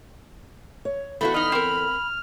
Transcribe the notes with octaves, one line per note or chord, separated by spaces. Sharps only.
C#5
E2 A3 E4 F#4 A4 F5 B5
D#4 D#5 F6
C4 A#4